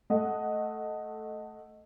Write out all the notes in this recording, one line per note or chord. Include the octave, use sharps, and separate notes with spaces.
A3 D#5 F#5